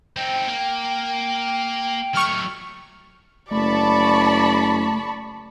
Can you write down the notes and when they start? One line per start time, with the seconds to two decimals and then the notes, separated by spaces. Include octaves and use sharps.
0.17 C4 D#4 G5
0.47 A#3
2.14 F#3 A3 C#6 F6
3.51 F#1 A3 D5 A5 B5 C#6